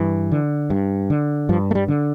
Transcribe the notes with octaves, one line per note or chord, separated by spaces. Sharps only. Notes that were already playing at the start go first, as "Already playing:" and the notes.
Already playing: G2 E3
D3
G2
D3
G2 F3
A3
G3
D3